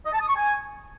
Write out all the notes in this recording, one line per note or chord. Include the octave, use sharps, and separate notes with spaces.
D#5
A5
D#6
C#6
G#5